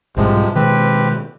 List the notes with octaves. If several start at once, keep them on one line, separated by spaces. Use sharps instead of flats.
B1 G#2 C3 F3 G3 G#3
B2 D#3 G#3 C4 G4 B4